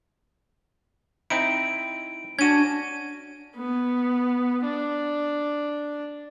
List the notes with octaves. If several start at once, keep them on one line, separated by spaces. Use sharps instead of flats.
C4 D#4 E4 D7
C#4 D4 F#4 G#6 D#7
B3
D4